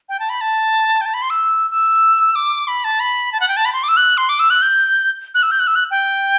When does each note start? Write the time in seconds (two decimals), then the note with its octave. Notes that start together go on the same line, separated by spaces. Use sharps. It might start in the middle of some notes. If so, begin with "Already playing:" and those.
0.09 G5
0.20 A5
0.29 B5
0.41 A5
1.01 G5
1.06 A5
1.14 B5
1.22 C6
1.30 E6
1.71 E6
2.35 D6
2.68 B5
2.84 A5
3.00 B5
3.32 A5
3.40 F#5
3.48 G5
3.57 A5
3.65 B5
3.73 C6
3.83 D6
3.89 E6
3.97 F#6
4.17 C6
4.29 D6
4.39 E6
4.50 F#6
4.62 G6
5.35 F#6
5.43 E6
5.51 G6
5.60 F#6
5.67 E6
5.75 F#6
5.91 G5